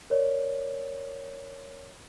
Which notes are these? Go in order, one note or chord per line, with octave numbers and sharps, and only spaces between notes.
A#4 C#5 D5